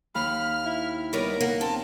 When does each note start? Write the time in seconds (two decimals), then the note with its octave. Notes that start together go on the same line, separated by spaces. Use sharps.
0.15 D#2 B5 F6
0.66 E4
1.13 G3 B3 D#4 A#4 C#5
1.41 A#3 F#5
1.61 C4 C#4 F4 A5